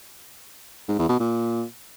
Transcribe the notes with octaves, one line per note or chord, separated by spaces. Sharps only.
G#2
E2
B2
A#2